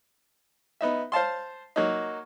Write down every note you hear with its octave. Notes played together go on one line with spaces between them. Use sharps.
B3 D#4 E5
C5 F5 A5 C6
F#3 A#3 D#4